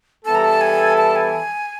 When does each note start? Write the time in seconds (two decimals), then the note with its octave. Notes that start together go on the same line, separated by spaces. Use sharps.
0.24 E3 G3 B3 E4 A4 A5
0.35 A#5
0.44 A5
0.61 G#5
0.97 A5
1.16 G#5